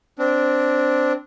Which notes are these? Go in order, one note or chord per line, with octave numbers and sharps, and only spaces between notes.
C4 D4